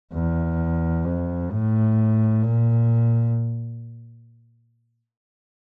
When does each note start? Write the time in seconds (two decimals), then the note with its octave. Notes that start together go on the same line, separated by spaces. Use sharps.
0.14 E2
1.05 F2
1.51 A2
2.43 A#2